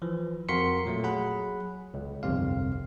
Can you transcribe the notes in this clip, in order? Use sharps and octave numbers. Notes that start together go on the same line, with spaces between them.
E3 F3
F2 F#4 A#4 C6 B6 C#7
A#2 F#3 A3
F#3 G#4 F#5 B5
C#2
G1 C2 F2 C3 F5